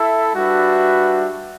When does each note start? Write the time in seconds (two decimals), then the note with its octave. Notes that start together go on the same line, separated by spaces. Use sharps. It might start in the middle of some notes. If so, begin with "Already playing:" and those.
Already playing: E4 A4 E5
0.34 G3 D4 F#4 B4 E5